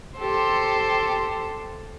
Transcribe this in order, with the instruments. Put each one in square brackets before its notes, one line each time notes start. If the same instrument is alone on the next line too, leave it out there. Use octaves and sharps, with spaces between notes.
[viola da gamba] G4 A4 C5